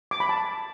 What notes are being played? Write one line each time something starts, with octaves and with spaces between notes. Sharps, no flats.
D6
B5
A5